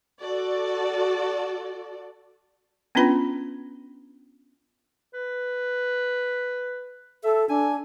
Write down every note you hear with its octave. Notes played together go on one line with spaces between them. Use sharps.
F#4 A4 D5
B3 C#4 D4 F4 B4 B5
B4
A4 E5
D4 G#5